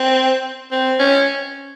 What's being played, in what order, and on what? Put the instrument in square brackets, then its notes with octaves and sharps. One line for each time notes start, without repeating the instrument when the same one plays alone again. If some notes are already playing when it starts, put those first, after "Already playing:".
Already playing: [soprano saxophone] C4
C4
C#4